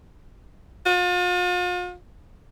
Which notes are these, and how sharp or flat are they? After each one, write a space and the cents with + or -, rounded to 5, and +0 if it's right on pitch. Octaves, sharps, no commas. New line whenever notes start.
F4 +40